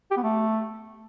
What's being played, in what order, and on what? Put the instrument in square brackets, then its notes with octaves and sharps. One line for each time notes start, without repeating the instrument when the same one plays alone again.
[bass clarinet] G4
B3
A3